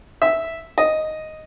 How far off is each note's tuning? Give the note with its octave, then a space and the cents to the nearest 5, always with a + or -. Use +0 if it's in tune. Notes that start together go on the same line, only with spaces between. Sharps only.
E5 -5
D#5 +0